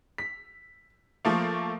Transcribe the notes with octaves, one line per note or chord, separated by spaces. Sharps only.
B6
F3 A3 A#3